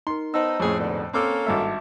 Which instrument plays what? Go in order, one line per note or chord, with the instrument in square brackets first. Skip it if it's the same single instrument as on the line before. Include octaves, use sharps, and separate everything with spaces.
[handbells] D#4 A#4 [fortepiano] C6
[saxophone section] B3 D#4 [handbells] C5 A5 E6
[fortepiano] F2 A2 [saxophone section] G#3 C#4 G#4
[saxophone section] G#2 B2 D3
[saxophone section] A#3 C#4 A4 [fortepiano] C4 D6 E6
[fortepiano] G#1 G2 E6 [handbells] E5 A5 D6